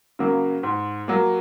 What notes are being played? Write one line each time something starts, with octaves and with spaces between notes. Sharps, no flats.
C#3 F#3 A#3
G#2
F#3 A#3